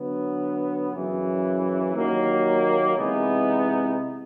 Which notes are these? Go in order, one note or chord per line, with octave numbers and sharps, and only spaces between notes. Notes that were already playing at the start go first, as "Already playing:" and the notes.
Already playing: D3 F#3 B3
F#2 C#3 E3
D#2 D#3 F#3 A#3
C3 E3 G#3 B3 D#4